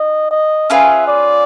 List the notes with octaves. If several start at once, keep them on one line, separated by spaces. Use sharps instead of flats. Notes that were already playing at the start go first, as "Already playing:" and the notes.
Already playing: D#4 D#5
D#5
C#4 F4 G#4 B4 E5
D5